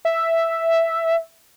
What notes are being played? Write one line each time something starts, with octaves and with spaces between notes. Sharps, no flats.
E5